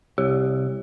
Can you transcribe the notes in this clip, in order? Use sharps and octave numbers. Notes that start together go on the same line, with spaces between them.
C2 G4